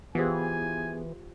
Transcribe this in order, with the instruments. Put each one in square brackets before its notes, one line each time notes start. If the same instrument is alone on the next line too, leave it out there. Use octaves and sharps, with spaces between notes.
[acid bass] E3 [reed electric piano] B3 G#4 [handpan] F4 G4 C5 [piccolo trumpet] G#5